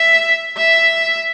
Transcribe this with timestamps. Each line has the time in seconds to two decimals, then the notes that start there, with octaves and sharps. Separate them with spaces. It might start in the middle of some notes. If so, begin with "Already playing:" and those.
Already playing: E5
0.57 E5